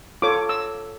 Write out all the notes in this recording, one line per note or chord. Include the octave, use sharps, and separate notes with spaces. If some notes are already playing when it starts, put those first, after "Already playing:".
F4 A4 C#5 D6
E6